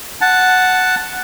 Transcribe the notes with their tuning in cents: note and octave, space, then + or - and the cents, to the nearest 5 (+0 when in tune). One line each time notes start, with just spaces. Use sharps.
F#5 +0 A5 +0